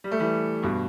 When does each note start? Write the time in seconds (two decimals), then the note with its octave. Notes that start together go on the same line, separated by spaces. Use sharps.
0.04 G3
0.11 A3
0.20 E3 G3
0.63 G2 B2